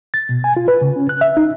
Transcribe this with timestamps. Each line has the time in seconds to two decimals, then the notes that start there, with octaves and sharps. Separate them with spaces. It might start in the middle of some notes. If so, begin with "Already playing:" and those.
0.14 A6
0.29 B2
0.44 G#5
0.57 F4
0.68 B4
0.81 C#3
0.96 C#4
1.09 F#6
1.21 E5
1.37 D#4